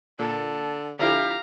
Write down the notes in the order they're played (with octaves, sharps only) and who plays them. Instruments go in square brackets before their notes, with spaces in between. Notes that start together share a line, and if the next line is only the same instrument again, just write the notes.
[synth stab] A#2 [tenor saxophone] D3 [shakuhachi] A5
[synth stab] D3 F3 E4 [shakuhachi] G4 [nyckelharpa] F5 A#5